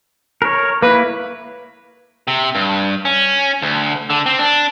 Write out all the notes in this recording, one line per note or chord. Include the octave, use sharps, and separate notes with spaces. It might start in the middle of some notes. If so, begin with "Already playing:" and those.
A#4 C#5
A#3 E4 B4
C3
G2
C#4
D2
D3
C4
D4